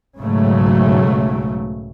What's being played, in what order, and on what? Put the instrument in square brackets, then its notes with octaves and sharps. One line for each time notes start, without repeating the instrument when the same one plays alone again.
[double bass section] B1 G#2 C#3 F#3 A3